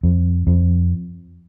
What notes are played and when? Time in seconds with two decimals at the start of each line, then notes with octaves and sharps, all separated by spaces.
0.03 F2
0.47 F2